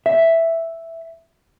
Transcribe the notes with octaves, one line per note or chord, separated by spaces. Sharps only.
E5